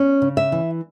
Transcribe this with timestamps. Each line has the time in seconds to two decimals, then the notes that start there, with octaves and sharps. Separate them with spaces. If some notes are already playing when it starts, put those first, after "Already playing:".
Already playing: C#4
0.22 C#3
0.37 E5
0.52 E3